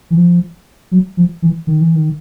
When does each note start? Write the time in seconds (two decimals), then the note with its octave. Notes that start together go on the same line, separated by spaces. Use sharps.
0.10 E3
0.17 F3
0.91 F#3
1.17 F3
1.42 E3
1.67 D#3
1.81 E3
1.95 D#3